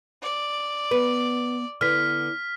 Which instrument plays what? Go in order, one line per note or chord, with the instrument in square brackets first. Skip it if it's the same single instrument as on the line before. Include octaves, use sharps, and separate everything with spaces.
[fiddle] D5
[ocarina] B3 [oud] B4
[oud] D3 B3 [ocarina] E4 [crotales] F6 B6